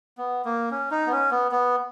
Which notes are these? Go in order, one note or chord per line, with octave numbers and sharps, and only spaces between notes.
B3
A#3
C#4
D#4
B3
C#4
B3
B3